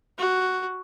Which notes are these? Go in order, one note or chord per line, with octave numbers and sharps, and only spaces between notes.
F#4